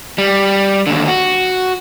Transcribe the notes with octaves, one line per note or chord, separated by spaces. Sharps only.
G3
D#2 D3
F#4